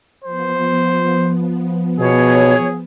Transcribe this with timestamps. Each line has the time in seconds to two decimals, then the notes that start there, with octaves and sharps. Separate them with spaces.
0.24 F3 B3 C5
2.00 B2 G#4 C#5